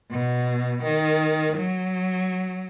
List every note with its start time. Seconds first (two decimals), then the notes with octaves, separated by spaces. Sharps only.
0.11 B2
0.83 D#3
1.57 F#3